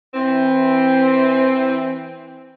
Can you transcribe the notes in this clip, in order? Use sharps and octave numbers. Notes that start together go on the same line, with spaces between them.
E3 C4